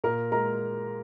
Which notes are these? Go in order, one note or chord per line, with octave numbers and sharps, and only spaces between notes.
A#2 A#4 A#5
G#3 A#4 A#5